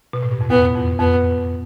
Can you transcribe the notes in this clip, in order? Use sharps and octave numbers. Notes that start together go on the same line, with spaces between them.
B2
A2
G2
F2
E2 B3
F2
F2 B3